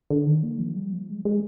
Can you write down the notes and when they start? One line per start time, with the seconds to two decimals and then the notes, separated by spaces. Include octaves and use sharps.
0.10 D3
0.26 D#3
0.43 A#3
0.59 F3
0.76 G3
0.93 F3
1.09 G#3
1.25 G#3